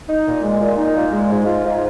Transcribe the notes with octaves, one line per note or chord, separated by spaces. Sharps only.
D#4
A#2
G#3
A#2
D#4
A#2
G#3
G#2
F4
G#2